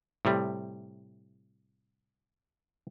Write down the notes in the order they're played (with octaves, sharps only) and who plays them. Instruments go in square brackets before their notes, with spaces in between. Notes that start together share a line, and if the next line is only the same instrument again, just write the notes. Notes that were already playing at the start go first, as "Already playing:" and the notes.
[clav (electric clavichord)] A2 C3 G3